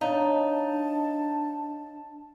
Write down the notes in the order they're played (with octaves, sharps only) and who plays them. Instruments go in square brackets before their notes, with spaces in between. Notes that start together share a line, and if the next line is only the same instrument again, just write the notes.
[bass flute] D4 [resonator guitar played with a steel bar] D#4 [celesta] C#5 D#5 F5 [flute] A5